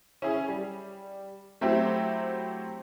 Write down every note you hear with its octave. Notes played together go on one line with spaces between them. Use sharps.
C#4 E4 G#4
G3
F#3 A3 C4 E4 G4 C5